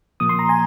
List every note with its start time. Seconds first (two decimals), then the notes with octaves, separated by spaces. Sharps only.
0.20 A#2 F3 A#3 D#6
0.29 C6
0.39 A#5
0.49 G#5